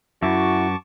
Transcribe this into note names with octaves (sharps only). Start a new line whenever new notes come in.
F#2 E4 F#4 A5 C#6 D6